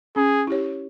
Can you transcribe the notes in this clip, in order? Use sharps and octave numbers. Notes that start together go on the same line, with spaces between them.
C#4 G#4
E4 G4 C#5